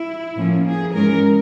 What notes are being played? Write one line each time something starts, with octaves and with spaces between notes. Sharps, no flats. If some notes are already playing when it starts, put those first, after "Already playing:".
Already playing: E4
A2 F3 A#3 C#4
G#4
G#2 E3 G#3 C#4 A#4